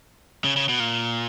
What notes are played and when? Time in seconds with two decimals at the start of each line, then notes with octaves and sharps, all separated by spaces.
0.44 C#3
0.56 C#3
0.69 B2
0.80 A#2